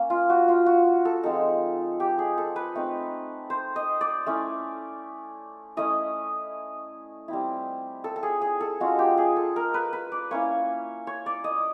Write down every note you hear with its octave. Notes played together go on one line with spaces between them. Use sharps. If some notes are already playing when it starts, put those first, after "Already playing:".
Already playing: A#3 C#4
F4
F#4
F4
F#4
A4
F3 G#3 C4 D#4 A4
G4
G#4
A4
B4
A3 C4 D#4
C5
D#5
D5
A3 C#4 E4
A3 C#4 E4 D#5
G3 C4 E4
A4
A4
G#4
G#4
A4
G#3 C#4 F4 F#4
G4
G#4
A4
A#4
B4
B4
D5
A#3 C#4 E4 C#5
C#5
D5
D#5